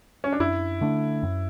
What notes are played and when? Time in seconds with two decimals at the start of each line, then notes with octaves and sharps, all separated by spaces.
0.24 C#4
0.32 D4
0.40 F#2 E4
0.81 D3 A3 D4
1.23 F#2